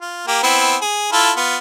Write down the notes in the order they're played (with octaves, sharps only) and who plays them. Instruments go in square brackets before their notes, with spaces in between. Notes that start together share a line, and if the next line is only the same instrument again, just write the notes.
[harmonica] F4
A#3 G4
B3 C4 E4
G#4
E4 F4 A4
B3 F4